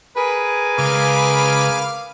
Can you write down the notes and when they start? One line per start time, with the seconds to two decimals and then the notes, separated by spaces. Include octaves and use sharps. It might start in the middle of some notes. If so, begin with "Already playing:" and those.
0.16 G#4 A#4 B4 G#5
0.79 C#2 F5 D6 F6